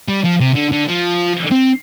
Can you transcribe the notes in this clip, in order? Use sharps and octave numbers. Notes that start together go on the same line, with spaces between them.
G3
F3
C3
D3
D3
F3
C4